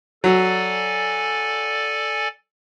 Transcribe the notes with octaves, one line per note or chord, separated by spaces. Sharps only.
F#3 A4 D5 G#5